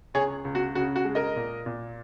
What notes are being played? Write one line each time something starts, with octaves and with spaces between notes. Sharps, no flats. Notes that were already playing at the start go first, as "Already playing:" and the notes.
C#2 G#4 C#5
C#2
F#4
C#3 F#4
F#4
G#3
A#4 D#5
A#2
A#2